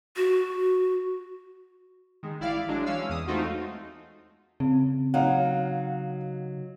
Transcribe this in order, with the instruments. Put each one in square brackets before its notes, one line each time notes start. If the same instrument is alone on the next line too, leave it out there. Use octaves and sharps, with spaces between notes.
[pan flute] F#4
[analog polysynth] D#3 G#3
A1 E4 D5 F5
F#3 G#3 D4
E3 C#4 F5 E6
E2 D#6
G#3 A3 C4 D#4 F4 F#4
[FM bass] C#3 [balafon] C4
[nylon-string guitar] F#3 D#4 [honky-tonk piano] F5 F#5